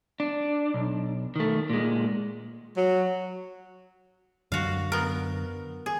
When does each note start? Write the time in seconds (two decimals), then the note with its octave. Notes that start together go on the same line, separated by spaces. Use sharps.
0.20 D4
0.74 B1
1.36 D#3 A3
1.70 A#2 G#3
2.77 F#3
4.52 F#2 D3 F#4 F5
4.92 B3 A#4
5.86 G#4